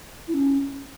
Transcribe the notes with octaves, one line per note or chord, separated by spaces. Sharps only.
E4
C#4